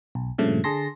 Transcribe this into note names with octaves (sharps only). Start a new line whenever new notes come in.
B1
G2 A#2 C#3 F3 A3
D3 G#4 A5 C6 A#6